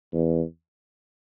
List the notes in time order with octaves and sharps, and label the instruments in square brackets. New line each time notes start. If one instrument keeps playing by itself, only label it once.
[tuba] E2